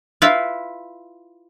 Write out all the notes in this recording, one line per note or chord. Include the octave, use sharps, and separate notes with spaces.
E4 F4 B4